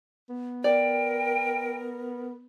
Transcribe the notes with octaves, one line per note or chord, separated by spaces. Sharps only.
B3
A#4 D5 G5